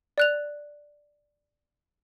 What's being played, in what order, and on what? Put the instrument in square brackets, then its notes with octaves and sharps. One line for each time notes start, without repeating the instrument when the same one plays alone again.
[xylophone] D5 F#6 F7